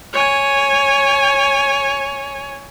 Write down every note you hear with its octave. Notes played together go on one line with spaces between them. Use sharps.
C#5 G#5